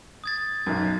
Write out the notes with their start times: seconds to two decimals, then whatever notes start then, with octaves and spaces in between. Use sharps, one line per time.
0.24 D#6 G#6 A6
0.66 B1 F#2